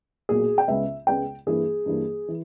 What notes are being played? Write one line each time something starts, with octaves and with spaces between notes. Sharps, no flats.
B1 A#2 A#3 G#4
G5
C#2 C#3 G#3 B3 E5
C#2 C#3 G#3 B3 G5
G2 E3 A#3 G#4
G2 E3 A#3
E3